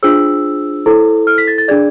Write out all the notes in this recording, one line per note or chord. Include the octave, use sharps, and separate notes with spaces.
D4 F4 G#4 C5 E6
E4 A4 C5
F6
B6
A6
A6
D4 G#4 D5 G#6